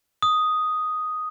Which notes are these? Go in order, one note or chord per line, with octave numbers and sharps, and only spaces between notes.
D#6